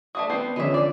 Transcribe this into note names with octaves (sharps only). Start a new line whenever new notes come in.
A3 D4 F#4 D#6
G3 B3 C4 C7
D3 F3 G#3 C#4 E5
D5